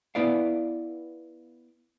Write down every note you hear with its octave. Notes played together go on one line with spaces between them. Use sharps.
B3 E4 B4 D5 F5